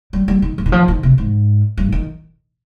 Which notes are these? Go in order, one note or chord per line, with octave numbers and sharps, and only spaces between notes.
G3
G3
D#3
F3
D#3
F3
D#3
C3
G#2
G2
D#3